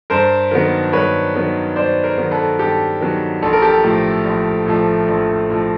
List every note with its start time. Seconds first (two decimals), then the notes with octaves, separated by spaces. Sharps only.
0.10 G2 A#4 C5
0.51 D#3 F#3 B3
0.93 G2 B4 C#5
1.35 D#3 F#3 B3
1.76 G2 C5 D5
2.04 A#4 C5
2.18 D#3 F#3 B3
2.31 A4 B4
2.59 G2 G4 A4
3.01 D#3 F#3 B3
3.42 A#1 A4
3.53 A#4
3.62 G4 A4
3.83 A2 F3 A3
4.25 A#1
4.66 A2 F3 A3
5.08 A#1
5.50 A2 F3 A3